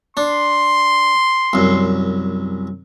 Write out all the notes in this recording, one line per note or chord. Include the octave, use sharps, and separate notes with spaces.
D4 C6
C2 F#2